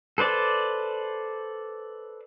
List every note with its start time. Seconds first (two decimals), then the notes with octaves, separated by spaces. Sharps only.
0.18 A4 B4 C5 D5